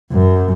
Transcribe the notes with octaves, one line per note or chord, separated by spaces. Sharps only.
F#2